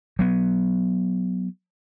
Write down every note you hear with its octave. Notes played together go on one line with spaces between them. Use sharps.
F#3 B3